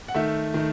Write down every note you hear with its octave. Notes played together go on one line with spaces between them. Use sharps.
F#5
D#3 A3 E5
D#3 A3